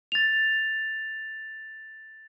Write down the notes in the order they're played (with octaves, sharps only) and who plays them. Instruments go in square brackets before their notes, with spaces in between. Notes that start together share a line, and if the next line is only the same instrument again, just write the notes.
[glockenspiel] A6 F7